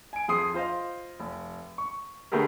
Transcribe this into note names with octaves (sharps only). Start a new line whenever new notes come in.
G#5 D7
F2 G#4 C6 D#6 C7
F4 C5 D#5 F5
F1
C#6
D3 A3 B3 G4 G#4 A#4